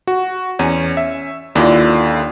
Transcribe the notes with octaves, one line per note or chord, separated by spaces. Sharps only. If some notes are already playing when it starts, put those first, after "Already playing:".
F#4
E2 C#4
E5
D#2 D3 E4 F4